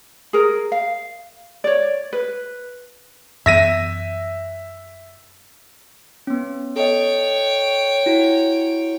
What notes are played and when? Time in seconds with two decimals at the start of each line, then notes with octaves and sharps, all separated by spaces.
0.33 G#4 A#4
0.72 F5
1.64 C#5 D5
2.13 B4
3.46 F#2 E3 B3 E5 A#6 D#7
6.27 B3 C#4
6.76 A4 C#5 D#5 G5
8.06 E4 F#4